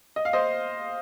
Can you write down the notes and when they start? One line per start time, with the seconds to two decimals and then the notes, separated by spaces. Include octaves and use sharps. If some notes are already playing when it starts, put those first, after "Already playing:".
0.16 D#5
0.25 F5
0.33 C5 D#5